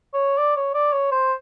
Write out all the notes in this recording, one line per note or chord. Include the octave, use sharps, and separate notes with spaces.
C#5
D5
C#5
D5
C#5
C5